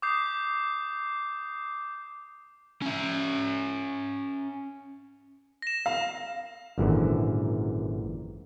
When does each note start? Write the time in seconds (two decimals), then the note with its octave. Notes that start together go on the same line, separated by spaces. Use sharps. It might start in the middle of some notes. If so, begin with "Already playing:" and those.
0.02 D6 D#6 G6 C7
2.82 C#4 E5
5.62 A#6 E7
5.86 F5
6.78 G#1 F#2 A#2 D3 E3